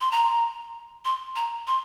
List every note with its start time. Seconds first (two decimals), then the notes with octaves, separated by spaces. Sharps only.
0.01 C6
0.11 A#5
1.05 C6
1.36 A#5
1.67 C6